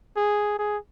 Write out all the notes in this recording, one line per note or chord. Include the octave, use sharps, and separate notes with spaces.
G#4
G#4